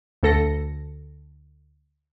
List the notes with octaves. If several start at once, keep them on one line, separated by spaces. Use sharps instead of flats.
D2 A4 A#6 C#7